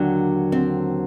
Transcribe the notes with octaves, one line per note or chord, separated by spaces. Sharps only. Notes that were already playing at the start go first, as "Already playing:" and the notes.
Already playing: D#2 D3 F#3 D4
C4